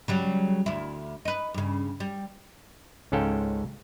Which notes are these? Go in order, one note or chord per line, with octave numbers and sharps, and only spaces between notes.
C#3 F#3 G3
D2 E4
D#4 B4
G2 C#3
G3
C#2 G#2 C#4 A4 F5 G5